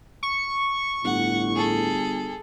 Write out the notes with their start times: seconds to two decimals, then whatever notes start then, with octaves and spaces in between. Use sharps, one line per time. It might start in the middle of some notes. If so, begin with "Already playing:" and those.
0.23 C#6
1.05 G1 A2 F#5
1.54 G#4 A4